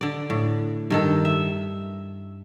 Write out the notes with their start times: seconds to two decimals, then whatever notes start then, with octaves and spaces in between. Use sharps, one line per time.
0.01 D3 D5
0.30 A2
0.90 G2 D#3 A4
1.25 E5